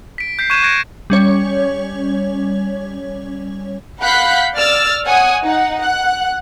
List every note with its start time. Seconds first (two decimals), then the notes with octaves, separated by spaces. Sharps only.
0.18 B6 D7
0.39 G6 B6 C7
0.50 C#6 F#6 G#6 D#7 E7
0.63 C#6 F#6 G#6 A#6 C#7 D7
1.10 G3 C#4 C#5
4.02 F5 F#5 B5 F#6 G6 B6
4.57 D5 E6 F6 A6
5.03 C#5 F#5 G#5 D#6
5.45 D#4 F#5
5.81 F#5 F#6